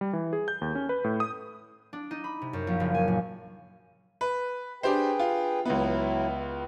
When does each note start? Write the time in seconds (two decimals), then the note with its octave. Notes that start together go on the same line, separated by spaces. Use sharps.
0.01 G3
0.13 E3
0.33 G#4
0.48 G6
0.61 D#2
0.75 C#4
0.89 B4
1.04 A2
1.20 D#6
1.93 D4
2.11 D#4
2.24 B5
2.42 C3
2.53 F#2
2.67 A#1
2.80 F#1
2.94 G#5
3.08 A#2
4.21 B4
4.83 D4 G4 G#4 B4 C5 G5
5.19 F4
5.65 C#2 F#3 B3 E4